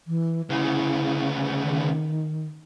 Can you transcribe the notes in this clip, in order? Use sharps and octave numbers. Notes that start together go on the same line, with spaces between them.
E3
D2 C#3 E4
D#3